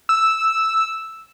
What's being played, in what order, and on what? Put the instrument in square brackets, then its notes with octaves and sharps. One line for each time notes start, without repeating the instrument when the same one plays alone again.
[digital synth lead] E6